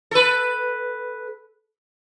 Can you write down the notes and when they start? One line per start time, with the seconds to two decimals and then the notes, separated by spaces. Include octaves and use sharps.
0.11 A4 B4